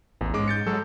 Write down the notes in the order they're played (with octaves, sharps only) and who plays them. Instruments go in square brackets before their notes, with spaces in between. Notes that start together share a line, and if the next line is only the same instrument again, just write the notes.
[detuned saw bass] A1 [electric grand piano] E2
[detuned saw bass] G#2 [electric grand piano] G#3 C#4 D6
[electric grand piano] G6 A6 C#7
[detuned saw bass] F#3 [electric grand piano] G#3 A4